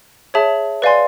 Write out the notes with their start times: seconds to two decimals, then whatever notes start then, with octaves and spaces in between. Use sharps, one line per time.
0.34 G#4 C#5 E5 A5
0.82 B4 D5 F5 G#5 C6